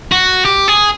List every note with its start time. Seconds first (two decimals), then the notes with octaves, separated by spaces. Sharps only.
0.12 F#4
0.45 G4
0.68 G#4